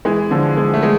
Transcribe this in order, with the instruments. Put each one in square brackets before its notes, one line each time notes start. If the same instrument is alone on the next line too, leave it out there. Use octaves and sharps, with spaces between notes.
[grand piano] E3 [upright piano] G#3
[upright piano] D3 [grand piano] F3
[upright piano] G#3
[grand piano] A3
[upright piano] G#3